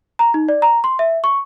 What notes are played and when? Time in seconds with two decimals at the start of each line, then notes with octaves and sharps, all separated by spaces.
0.19 A#5
0.34 D#4
0.49 D5
0.62 A#5
0.84 C6
0.99 E5
1.24 C#6